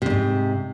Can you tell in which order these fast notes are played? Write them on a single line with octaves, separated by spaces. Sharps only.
C3 E2 G#2